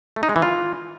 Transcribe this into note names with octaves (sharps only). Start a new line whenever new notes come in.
A3
D#4
G#3
E3
F4